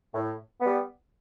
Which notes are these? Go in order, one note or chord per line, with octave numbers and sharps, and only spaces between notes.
A2
G3 B3